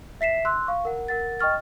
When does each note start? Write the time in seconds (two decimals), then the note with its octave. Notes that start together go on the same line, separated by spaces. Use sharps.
0.21 E5 B6 C7 E7
0.45 C6 E6 F#6
0.67 F5 C#6
0.85 A#4 F#5
1.08 A#4 F#5 A6
1.40 D#5 G5 C#6 F6 A6